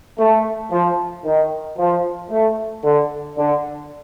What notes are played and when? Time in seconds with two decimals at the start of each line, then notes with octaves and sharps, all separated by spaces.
0.19 A3
0.71 F3
1.25 D#3
1.78 F3
2.31 A3
2.84 D3
3.37 D3